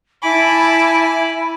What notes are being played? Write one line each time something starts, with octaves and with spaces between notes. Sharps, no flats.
E4 G#5 A5 B5 D6